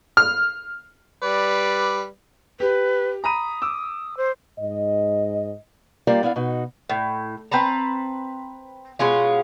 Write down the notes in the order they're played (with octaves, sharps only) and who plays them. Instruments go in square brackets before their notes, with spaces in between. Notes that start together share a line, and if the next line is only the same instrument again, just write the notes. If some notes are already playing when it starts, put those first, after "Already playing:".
[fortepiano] F6
[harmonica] G3 B4 D5
[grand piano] G4 [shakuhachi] B4
[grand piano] A#5 B5 D#7 [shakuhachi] D#6
[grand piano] D6 E6
[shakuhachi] C5
[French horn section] G#2 D#5
[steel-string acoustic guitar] G3 A#3 F4 G4 D5
B3 E4 D5 F5
B2 D#4 F#4
[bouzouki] A2
C4 B4 A5 A#5
B2 G#3 C#4 F4